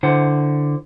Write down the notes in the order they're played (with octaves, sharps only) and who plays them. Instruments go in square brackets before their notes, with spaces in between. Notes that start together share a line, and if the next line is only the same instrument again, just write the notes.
[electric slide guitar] D3 E4 C5 F#5